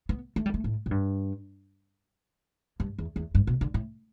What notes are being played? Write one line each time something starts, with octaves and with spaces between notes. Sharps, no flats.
B3
A3
G3
A3
A2
A2
G2
G2
E2
E2
G2
B2
D3
A2